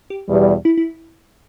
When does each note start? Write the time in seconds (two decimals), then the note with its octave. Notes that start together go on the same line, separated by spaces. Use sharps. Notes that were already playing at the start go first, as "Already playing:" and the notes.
0.10 G4
0.28 E2 B2 G3
0.65 E4
0.77 E4